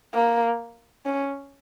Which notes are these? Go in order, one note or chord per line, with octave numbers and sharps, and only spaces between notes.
A#3
C#4